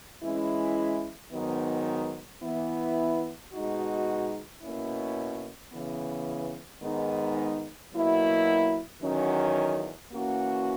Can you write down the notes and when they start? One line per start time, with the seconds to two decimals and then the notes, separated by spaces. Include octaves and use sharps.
0.23 E3 G#3 C#4 E4
1.32 G#2 D#3 F#3 B3
2.43 E3 B3 E4
3.53 B2 G#3 D#4 F#4
4.62 B2 A#3 C#4 E4
5.73 C#3 E3 B3
6.83 G#2 D#3 G#3 B3 D#4
7.93 B2 F#3 A#3 E4
9.03 E2 D#3 F#3 C#4
10.13 E3 A#3 C#4 F#4